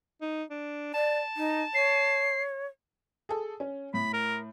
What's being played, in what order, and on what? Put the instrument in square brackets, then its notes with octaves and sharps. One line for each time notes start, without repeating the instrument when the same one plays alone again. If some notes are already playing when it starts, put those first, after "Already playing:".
[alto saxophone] D#4
D4
[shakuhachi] D5 [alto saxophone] A5
[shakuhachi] D#4
[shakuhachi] C#5 [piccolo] C7
[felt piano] G#4 A4
C#4
[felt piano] A2 [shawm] B5
[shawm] A#4